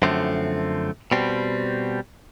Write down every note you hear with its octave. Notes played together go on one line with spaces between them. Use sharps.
F#2 D3 F3 A3 C4
B2 G3 C4